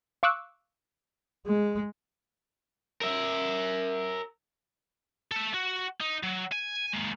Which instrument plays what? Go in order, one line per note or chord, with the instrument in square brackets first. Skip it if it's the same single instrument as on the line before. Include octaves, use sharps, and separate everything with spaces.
[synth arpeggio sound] F5 C#6 D6 E6 F#6
[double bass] G#3
[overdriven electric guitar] A#4 E5
[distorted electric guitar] A4 E5
F#4
D#4
F#3
G#5
G#3 A#3